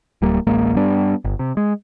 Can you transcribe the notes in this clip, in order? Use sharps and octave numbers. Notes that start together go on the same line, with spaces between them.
D1 G3 A#3
D1 A1 G#3 A#3
G2 G3 B3 D4
G1
C3
G#3